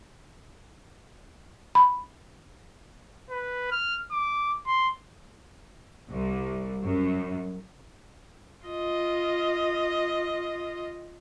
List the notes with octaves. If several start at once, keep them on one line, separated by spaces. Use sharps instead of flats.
B5
B4
F6
D6
C6
C2
F#2
F4 D#5